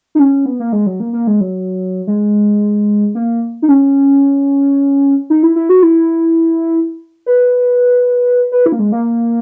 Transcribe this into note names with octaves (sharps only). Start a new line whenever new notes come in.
D#4
C#4
B3
A#3
G#3
F#3
A#3
A#3
G#3
F#3
G#3
A#3
D#4
C#4
D#4
E4
E4
F#4
E4
B4
B4
E4
A#3
G#3
A#3